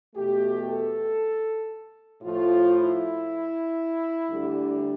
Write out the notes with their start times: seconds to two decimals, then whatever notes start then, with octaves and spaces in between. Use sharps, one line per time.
0.14 E2 B2 A3 G4
0.66 A4
2.22 A2 F3 A3 F4
2.73 E4
4.29 D2 D3 G3